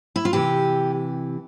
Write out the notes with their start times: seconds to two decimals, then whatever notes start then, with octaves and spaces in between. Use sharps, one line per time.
0.16 E4
0.25 F4
0.33 C3 E3 G4